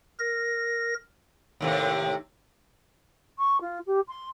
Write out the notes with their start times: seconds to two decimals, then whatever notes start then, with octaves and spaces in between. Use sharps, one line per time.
0.19 A#4 A#6
1.61 D#2 A2 C3
3.38 C#6
3.60 F4
3.86 G4
4.08 C6